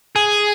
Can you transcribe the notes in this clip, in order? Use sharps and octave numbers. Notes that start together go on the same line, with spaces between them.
G#4